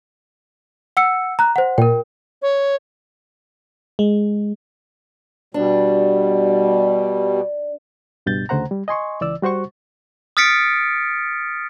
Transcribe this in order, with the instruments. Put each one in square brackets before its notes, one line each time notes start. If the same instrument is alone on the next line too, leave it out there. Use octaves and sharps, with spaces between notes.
[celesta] F#5 E6 C#7
A#5 F#6
C5 F#5
[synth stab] A#2 [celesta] A#4 G5
[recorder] C#5
[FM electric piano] G#3
[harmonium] B2 G3 [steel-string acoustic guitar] D4
[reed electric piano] C#2 G2 B2 G6 A6
D2 C#3 A3 C5 F#5 A#5
G3
D#5 G#5 C6 C#6
C#2 E3 D5 E6
G3 F#4 C5 F#5 C#6
[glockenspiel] D#6 F6 A6 B6 C#7 D7